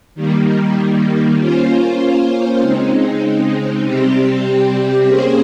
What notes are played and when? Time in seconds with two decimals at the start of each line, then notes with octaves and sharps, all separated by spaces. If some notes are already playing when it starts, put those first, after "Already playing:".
0.15 D#3 G3 A#3
1.37 A#3 C#4 F4 C5
2.60 C#3 G#3 C4 D#4
3.84 C3 G3 C4 G4
5.06 A#3 C#4 G#4 C5